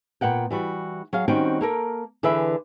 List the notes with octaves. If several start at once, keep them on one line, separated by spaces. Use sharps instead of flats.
A#2 B3 F#5 G5
E3 G3 F#4
F#3 G#4 F5
D#3 G3 C4 C#4 F#4 G5
A#3 A4 A#4
D3 E3 G#4 B4 D5 E5